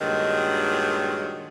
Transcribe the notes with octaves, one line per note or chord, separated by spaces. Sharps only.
G2 A#2 D#3 F#3 G#3